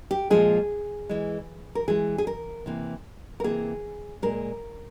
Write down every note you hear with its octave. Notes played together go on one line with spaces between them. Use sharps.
G4
A#2 F3 G#3 G#4
E3 G#3
A#4
E3 G#3 G#4
G#4
A#4
C3 E3 A#3
A#4
C3 E3 A#3 G#4
A#2 G#3 A#4